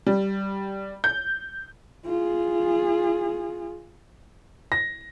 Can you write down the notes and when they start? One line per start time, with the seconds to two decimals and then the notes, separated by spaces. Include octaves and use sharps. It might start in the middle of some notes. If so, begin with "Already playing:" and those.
0.06 G3
1.04 G6
2.06 F4 G#4
4.72 A#6